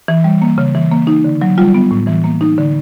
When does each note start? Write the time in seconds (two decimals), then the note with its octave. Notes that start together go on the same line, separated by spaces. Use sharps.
0.08 E3
0.24 G3
0.42 A#3
0.58 C#3
0.75 E3
0.92 A#3
1.07 D#4
1.24 D3
1.41 F#3
1.58 G3 F4
1.74 B3
1.91 A2
2.07 E3
2.24 A#3
2.41 D#4
2.58 D3